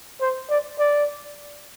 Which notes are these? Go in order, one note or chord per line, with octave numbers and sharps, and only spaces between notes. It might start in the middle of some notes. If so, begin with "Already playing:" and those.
C5
D5
D5